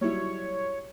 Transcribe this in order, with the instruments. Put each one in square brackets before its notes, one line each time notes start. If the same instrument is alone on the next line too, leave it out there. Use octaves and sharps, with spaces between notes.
[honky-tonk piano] F#3 G3 E4 [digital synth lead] C#5